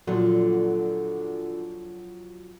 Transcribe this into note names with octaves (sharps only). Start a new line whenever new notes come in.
A#2 D3 F3 F#3 F4